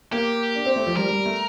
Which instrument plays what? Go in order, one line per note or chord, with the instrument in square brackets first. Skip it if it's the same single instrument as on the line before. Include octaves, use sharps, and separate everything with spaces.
[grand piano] A#3 [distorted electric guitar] G4
[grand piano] D4
C4
A3
F3
[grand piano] G3 [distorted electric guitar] A#4
[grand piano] G3
A3